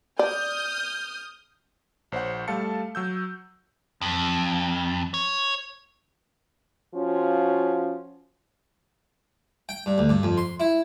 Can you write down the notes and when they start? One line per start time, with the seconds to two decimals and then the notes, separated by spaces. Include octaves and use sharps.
0.19 D5 D#6 F6 G6
2.12 A#1 C5 C#5 F#5
2.48 G3 A3 A4 F5 A5 C#7
2.95 F#3 E6 G6
4.01 F2
5.14 C#5
6.95 F3 C#4 F4 F#4
9.69 G5
9.86 G2
9.98 D2
10.09 G2
10.23 F2
10.38 C6
10.60 E4